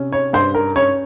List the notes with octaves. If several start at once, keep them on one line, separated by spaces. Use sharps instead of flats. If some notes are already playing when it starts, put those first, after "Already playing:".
Already playing: C3 C#4
C#5
G2 C5
A#4
C#4 C#5